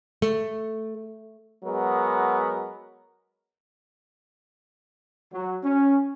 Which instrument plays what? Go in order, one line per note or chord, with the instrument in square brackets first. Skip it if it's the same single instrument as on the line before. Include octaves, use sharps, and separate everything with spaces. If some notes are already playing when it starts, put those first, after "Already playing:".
[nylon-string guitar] A3
[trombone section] F#3 G#3 B3 A#4
[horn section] F#3
C#4